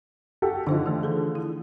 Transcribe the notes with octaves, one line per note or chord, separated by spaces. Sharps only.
F#4 G4 A4
D3 F3 D#4 C5 D#5
D#3 E3 A3
G#4 A4
E4